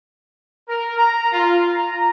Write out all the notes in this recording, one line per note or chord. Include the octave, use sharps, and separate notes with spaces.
A#4
A#5
F4
A#5